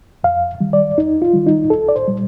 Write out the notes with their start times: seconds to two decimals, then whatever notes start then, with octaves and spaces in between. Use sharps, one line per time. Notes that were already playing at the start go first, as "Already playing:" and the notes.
0.24 F2 F5
0.60 D#3 G3
0.73 D5
0.97 F2 D#4
1.22 F4
1.33 D#3 G3
1.47 D#4
1.70 C2 A4
1.88 D5
1.96 C5
2.08 A#2 G3